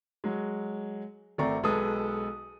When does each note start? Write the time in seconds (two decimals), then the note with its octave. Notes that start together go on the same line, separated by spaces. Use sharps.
0.24 F#3 G#3
1.38 G#1 A3 C4 D5 A#5 C#6
1.63 B1 G#3 A4 B4 D#6